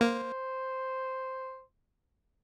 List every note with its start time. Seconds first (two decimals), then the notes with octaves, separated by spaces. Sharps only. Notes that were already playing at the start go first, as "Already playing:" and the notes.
0.01 A#3 C5